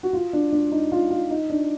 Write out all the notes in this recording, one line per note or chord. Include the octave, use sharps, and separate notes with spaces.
F#4
F4
D4
D4
D#4
F4
F4
D#4
D4